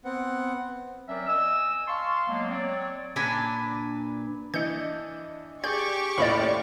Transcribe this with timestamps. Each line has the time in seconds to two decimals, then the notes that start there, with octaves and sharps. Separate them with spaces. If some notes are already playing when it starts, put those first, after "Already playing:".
0.05 B3 C4 F#5
1.08 F#3 C4 C#4 A#4 D5 E5
1.27 D#5 G#5 E6
1.87 F5 A5 C6 C#6
2.28 F#3 G#3 A#3 B3
2.50 F#3 C4 C#5 D5
3.16 A#2 D4 B4 G#5
4.54 E3 D4 D#5 G6 C#7
5.64 G4 G#4 D5 C#6 D6 G6
6.18 D#2 A2 C#4 F4 C5 D5 B5